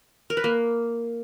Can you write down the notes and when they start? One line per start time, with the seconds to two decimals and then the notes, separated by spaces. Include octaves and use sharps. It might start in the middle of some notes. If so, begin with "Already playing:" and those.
0.30 A#4
0.37 B4
0.44 A#3